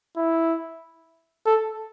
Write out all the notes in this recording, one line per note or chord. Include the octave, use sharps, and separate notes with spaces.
E4
A4